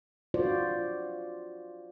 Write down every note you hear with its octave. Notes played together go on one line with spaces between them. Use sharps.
F4 F#4 C5 D5